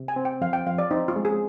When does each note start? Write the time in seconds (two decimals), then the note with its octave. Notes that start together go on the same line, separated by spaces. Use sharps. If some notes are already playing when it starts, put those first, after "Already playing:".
Already playing: C3
0.08 G#5
0.16 C4
0.25 G5
0.41 F2 F5
0.53 G5
0.66 F2 F5
0.78 D5
0.91 C4 D#4
1.08 F4
1.16 G#3
1.25 G#4